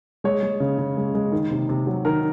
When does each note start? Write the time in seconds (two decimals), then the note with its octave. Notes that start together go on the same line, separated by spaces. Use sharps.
0.24 G#3 C#5
0.43 G#3
0.60 C#3
0.78 C#3
0.97 G#3
1.14 G#3
1.32 D#3
1.51 C3
1.69 C3
1.87 F#3
2.05 D#3 A#4